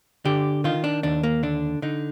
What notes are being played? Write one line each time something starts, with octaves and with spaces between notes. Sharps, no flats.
D3 G4
D#3 F4
D4
D#2 D4
A#3
D3 D4
D3 D#4